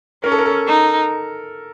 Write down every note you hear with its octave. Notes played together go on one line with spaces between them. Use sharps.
C#4 A#4
A4
A#4
A4
D#4